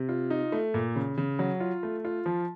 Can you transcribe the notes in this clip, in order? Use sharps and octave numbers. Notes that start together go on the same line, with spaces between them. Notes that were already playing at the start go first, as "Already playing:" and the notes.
Already playing: C3
F4
D#4
A3
A#2
C#3
C#3
F#3
F4
A3
F4
F3